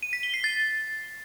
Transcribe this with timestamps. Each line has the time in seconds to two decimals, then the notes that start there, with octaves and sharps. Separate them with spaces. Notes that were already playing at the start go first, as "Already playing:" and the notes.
0.03 D#7
0.13 B6
0.23 G7
0.34 C7
0.44 A6